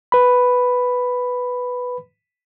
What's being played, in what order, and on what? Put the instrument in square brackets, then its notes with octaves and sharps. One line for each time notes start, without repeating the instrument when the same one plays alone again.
[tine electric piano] B4 B5